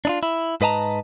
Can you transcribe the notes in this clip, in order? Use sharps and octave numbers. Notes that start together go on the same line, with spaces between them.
D4 D#4 F4
E4
G#2 B4 D#5 A5 A#5